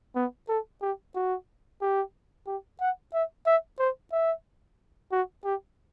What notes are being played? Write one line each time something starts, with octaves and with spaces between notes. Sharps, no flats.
B3
A4
G4
F#4
G4
G4
F#5
E5
E5
C5
E5
F#4
G4